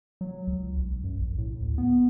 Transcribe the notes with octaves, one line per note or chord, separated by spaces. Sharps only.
F#3
C#2
B1
F#2
A#1
A2
D2
B3